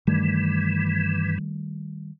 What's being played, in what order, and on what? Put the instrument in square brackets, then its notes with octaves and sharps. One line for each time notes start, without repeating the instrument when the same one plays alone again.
[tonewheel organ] G2 E3 [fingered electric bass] D#3 G3 A3